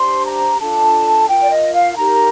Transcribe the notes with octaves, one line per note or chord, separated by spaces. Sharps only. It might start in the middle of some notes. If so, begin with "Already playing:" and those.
Already playing: D4 G4 C5 C6
A#5
D4 F4 A4 A5
F4 A#4 G5
D5
D#5
F5
D#4 G4 A#4 A#5